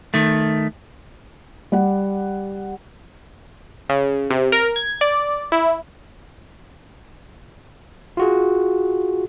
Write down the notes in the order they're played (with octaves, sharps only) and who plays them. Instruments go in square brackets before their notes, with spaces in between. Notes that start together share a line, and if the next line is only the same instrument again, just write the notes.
[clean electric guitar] D#3 A3
[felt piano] G3 D5 F#5
[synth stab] C#3
C3
A#4
G#6
D5
E4
[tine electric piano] F4 F#4 G#4